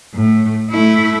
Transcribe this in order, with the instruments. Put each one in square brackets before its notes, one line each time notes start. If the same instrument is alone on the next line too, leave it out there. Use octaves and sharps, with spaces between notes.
[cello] A2 A3
A3 E4